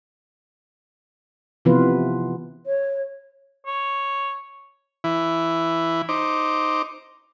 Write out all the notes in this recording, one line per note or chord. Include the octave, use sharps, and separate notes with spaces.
C3 E3 F3 B3 F4 B4
C#5
C#5
E3 E4
D#4 C5 D6